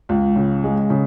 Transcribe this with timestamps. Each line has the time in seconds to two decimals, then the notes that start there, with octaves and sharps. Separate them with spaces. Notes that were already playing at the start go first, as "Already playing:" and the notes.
0.09 C#2
0.36 C#3
0.64 G#3
0.90 C#3